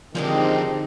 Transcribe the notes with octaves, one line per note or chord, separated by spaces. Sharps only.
D3 D#3 F3 G#3 C4 D4 D#4 G4